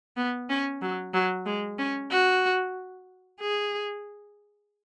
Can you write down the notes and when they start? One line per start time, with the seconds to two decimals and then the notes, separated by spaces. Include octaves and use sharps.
0.17 B3
0.49 C#4
0.82 F#3
1.14 F#3
1.46 G#3
1.78 C#4
2.10 F#4
3.40 G#4